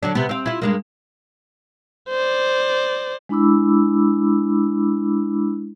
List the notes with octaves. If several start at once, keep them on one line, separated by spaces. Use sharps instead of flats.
D3 F#3 D4
C3 B3
C4 F5
E4 F4
G2 G#3 A#3
C5 D5
G#3 D4 E4 B5 D6 E6